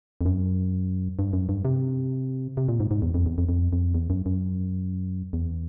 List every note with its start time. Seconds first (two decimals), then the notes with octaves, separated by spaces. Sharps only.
0.21 F2
0.25 F#2
1.19 G2
1.33 F#2
1.49 G2
1.65 C3
2.57 C3
2.69 A#2
2.80 G#2
2.91 G#2
3.02 E2
3.14 F2
3.26 E2
3.38 F2
3.49 F2
3.73 F2
3.94 E2
4.10 F#2
4.26 F#2
5.33 E2